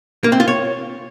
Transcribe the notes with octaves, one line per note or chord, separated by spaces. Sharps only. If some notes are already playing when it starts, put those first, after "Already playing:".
A#3
C4
F4
C#5